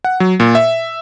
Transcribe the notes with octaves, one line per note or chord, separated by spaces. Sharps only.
F#5
F#3
A#2
E5